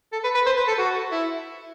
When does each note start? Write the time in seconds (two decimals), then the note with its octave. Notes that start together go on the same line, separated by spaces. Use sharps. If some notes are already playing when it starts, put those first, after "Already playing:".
0.13 A4
0.24 B4
0.35 B4
0.46 C5
0.57 B4
0.68 A4
0.78 F#4
1.12 E4